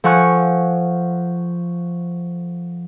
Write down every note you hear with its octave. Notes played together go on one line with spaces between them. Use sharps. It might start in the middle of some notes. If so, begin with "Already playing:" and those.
F3 A4 F#5 G#5 C#6 F#6